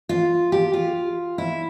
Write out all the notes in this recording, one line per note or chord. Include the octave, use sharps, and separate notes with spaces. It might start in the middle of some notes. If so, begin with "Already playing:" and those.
F4
G4
F4
E4